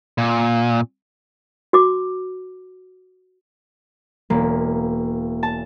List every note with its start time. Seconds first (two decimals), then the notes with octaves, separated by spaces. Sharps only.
0.18 A#2
1.73 F#4 D6
4.30 E1 A#3
5.43 A5